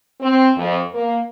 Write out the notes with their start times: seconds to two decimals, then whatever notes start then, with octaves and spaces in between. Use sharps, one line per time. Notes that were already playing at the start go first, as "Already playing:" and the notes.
0.21 C4
0.57 F2
0.94 A#3